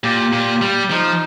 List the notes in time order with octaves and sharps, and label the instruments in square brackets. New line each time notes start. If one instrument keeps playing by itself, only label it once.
[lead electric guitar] A#2 [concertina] G4
[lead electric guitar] A#2
G3
[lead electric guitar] F3 [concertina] D#4